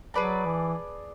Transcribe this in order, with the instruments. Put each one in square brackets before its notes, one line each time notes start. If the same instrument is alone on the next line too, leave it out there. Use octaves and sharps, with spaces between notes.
[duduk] F#3 [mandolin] G#4 B4 D5 A5
[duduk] E3